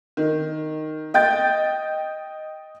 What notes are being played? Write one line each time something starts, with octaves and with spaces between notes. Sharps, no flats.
D#3
D#5 G5 G6 A6